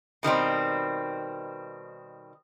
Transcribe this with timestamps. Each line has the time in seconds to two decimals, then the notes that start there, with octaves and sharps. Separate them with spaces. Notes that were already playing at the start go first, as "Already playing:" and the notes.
0.23 B2 D#3 G3 C4